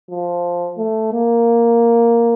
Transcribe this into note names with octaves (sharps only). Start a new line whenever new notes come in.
F3
A3
A#3